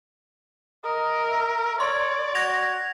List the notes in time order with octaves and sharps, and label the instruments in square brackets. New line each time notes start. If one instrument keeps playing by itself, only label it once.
[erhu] A#4 [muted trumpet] D#5
[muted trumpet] E5
[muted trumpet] C#5 [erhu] D5 [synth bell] C6
[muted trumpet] F#4 [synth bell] G#6 A#6 F7